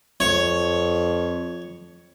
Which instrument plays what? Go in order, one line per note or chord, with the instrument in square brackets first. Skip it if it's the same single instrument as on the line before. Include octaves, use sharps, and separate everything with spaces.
[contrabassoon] F2 [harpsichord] C#5